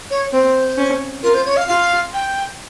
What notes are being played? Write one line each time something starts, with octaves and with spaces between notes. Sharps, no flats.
C#5
C4 C5
C#4
F4 A#4
C5
C#5
F5
F4 F5
G5